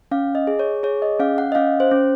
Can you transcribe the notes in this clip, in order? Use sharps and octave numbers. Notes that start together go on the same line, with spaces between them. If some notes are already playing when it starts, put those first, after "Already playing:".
C#4 F5
D#5
G#4
C#5
G#4 C#5
D#5
C#4 F5
F#5
D#5
C#4 F5
C5
C#4